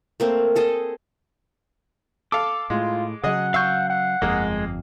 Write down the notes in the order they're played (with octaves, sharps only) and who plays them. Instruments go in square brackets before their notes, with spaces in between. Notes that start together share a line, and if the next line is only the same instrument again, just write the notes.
[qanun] A3 A#3 C4
G#4 A4 D#5
[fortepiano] A4 F5 [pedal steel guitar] D6
[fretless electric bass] A2 [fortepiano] G#3 [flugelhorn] F4
[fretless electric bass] C#3 F#3 [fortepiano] G#4 D#5 [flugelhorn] F#5
[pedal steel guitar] F5 G6 [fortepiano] C#6 E6
[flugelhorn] F#5
[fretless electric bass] G1 F2 [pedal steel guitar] G#3 [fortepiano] A#3 G#4